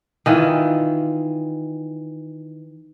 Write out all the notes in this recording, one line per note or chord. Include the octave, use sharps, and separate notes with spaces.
D#3 E3 F4